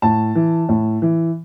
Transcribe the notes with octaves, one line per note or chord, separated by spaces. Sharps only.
A2 A5
E3
A2
E3